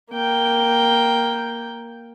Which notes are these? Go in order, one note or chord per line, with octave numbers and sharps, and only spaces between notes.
A#3 G5